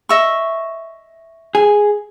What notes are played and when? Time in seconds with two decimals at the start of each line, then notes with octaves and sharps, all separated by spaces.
0.09 D#5 E5 C#6
1.55 G#4